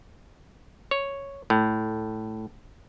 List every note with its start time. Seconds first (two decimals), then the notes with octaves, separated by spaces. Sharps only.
0.91 C#5
1.50 A2